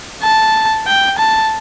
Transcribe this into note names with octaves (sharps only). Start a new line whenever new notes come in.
A5
G5
A5